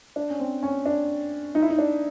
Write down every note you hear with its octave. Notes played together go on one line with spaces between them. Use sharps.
D4
C#4
C4
C#4
D4
D#4
E4
D#4
D4